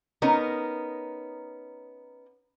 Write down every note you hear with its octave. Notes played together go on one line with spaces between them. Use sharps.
B3 C#4 D#4 A#4